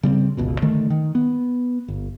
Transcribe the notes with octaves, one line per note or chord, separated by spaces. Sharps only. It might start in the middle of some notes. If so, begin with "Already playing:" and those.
C#3 G3 B3 C4
G1 C#2 B2
D3 D#3 A3
D#3
B3
G1